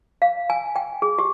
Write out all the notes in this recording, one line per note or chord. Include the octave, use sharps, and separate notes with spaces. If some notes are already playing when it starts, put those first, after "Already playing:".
F5
G#5
G5
G#4
G4